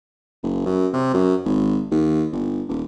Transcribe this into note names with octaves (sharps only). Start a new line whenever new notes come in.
F#1
F#2
C3
F#2
G#1
D#2
G1
D#1